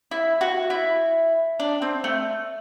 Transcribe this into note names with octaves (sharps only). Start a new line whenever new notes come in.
E4
F#4
E4
D4
C4
A3